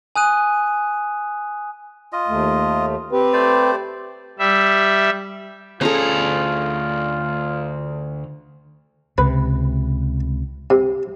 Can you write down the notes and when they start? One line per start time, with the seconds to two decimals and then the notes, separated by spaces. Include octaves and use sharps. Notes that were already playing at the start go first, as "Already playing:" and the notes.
0.16 G#5 D#6 F#6 D#7
2.13 F4 D#5
2.28 D#2 A3
3.12 C4 G4 B4
3.33 A3 C5 D5
4.39 G3 E5
5.81 D2 C#4 F4 G#4 A4 A#5
9.18 C#2 C3 B4
10.70 C3